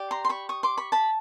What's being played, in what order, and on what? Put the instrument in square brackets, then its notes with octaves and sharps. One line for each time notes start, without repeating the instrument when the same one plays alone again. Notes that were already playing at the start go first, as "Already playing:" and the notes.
Already playing: [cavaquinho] G4 D5
A#5 C6
C6
B5 C#6
C#6 D#6
C6 D6
B5 C#6
A5 B5